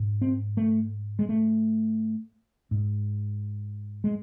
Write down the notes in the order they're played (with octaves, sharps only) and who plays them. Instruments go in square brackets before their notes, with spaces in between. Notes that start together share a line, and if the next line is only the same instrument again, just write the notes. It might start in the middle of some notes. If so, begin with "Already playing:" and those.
Already playing: [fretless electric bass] G#2
C4
A3
G#3
A3
G#2
G#3